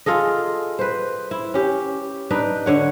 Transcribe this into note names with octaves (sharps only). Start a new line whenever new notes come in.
F4 G#4 A4 D#5
B4 C5
E4
C#4 G4
D4 D#4 B4
D3 C#5 F#5